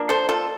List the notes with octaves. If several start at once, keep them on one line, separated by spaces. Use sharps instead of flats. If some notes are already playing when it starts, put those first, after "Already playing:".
Already playing: F3 A#3 D4
A4 C5
F4 A4